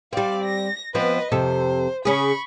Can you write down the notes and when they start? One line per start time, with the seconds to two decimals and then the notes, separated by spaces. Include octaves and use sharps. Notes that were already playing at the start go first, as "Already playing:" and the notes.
0.13 G3 C4 D5 F5
0.44 A#6
0.95 F3 B3 C4 B4 D#5
1.32 F2 C3 A4 C5
2.05 C#3 C#4 G#4 B5 C#6